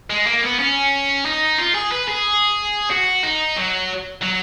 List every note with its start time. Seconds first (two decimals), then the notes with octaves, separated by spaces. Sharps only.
0.10 G#3
0.26 A#3
0.43 B3
0.59 C#4
1.25 D#4
1.58 F4
1.75 G#4
1.91 B4
2.08 G#4
2.90 F#4
3.23 D#4
3.56 F#3
4.21 F#3